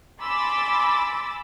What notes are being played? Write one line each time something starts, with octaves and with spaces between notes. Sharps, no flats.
G#5 B5 C6 D6 E6 A6